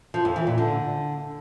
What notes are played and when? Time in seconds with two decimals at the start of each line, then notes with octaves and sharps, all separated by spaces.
0.14 F3
0.25 F2
0.36 E3
0.47 A#2
0.58 D3